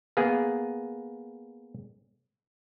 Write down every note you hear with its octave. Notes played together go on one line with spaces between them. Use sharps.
A#3 B3 G#4